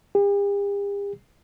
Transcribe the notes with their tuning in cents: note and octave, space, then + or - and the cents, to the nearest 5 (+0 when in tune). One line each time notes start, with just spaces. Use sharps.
G4 +45